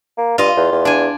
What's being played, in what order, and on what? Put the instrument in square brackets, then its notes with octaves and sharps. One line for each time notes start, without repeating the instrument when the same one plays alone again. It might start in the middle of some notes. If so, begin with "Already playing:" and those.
[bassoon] A#3
[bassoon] G2 [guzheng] F4 D#5
[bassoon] E2
E2
[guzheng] D4 G#5